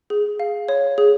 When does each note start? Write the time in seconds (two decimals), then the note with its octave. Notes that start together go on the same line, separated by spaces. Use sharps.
0.10 G#4
0.40 F5
0.69 C#5
0.98 G#4